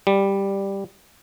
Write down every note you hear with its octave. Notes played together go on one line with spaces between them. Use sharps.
G3